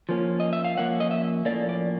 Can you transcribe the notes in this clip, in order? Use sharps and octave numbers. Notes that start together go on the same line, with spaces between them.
F3 A#3 C#4
D#5
E5
F5
F3 A#3 C#4 F#5
D#5
E5
A2 F3 A#3 C#4 D5
D5